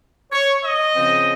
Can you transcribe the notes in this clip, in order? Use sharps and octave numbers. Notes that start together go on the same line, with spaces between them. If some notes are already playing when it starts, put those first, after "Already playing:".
C#5
D#5
C#3 F3 C4